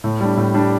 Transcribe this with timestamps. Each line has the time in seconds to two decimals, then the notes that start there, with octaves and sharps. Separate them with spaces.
0.04 A2
0.21 G3 D4
0.37 A2
0.54 G3 D4